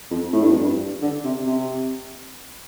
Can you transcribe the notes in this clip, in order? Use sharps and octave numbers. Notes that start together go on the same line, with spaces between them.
F2
A2
G2
F2
G2
D3
C3
C3